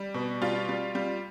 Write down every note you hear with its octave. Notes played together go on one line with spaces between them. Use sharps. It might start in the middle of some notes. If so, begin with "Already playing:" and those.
Already playing: G3
B2
G3 F4
G3
G3